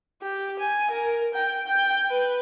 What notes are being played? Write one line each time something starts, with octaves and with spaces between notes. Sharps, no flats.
G4
G#5
A#4
G5
G5
B4